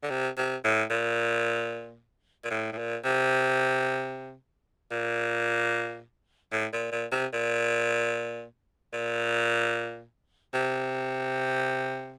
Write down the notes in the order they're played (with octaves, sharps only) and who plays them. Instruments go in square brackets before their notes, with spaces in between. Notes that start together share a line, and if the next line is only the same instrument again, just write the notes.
[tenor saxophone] D3
C3
C3
A2
A#2
A#2
A2
A2
A#2
C3
A#2
A2
A#2
A#2
C3
A#2
A#2
C3